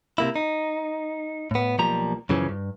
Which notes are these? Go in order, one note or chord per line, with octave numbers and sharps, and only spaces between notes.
C3 A#3 E4
D#4
A2 B3
B1 F3 G3 A#3 A#5
F#2 C#3 E3 F3 C#4
G2